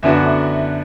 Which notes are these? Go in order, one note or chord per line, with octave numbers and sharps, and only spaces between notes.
F#2 D3 B3 D4 F#4 E5